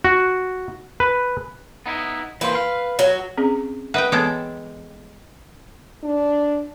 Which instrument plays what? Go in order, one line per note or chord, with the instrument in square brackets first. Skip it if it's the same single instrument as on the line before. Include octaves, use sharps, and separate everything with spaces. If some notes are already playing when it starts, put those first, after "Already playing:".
[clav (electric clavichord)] F#4
B4
[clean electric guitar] B3 D#4 E4
[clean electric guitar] E3 A#3 C5 [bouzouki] B4
[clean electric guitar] F5
[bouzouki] F#3
[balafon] C4 C#4 G#4
[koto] B4 D#5 G5 [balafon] E5 F#5
[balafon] E3 B3 [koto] G#3 A4 G5
[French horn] D4